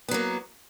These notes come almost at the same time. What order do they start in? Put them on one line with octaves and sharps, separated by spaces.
B3 F#3 A#3